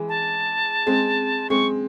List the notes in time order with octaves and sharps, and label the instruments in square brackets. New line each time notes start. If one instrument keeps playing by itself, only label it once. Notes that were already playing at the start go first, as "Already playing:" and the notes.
Already playing: [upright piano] E3 G#3
[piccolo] A5
[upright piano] G#3 C4
[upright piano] G#3 C4 [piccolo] C#6